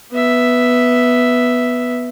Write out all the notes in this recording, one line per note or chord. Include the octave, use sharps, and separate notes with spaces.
B3 E5